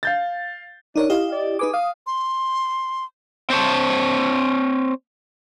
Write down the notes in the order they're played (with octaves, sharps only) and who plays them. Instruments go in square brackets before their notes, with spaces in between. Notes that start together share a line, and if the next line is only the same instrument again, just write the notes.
[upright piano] F5 G6 A6
[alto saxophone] D4 [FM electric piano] D#4 A#4 C#5
[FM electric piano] E4 G4 D#5 [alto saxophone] F5
[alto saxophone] D5
[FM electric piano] D#4 B4 D6 [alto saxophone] G#4
[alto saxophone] F5 [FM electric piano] D#6
[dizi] C6
[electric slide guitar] C4 C5 C#5 A5